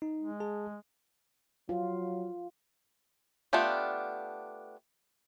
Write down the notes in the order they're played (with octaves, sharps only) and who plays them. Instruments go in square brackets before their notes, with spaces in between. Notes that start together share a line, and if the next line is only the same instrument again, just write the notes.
[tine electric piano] D#4
[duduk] G#3
[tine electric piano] G#4 A5
[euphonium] F#3 [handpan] F4
[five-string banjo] A3 B3 D4 F4 G4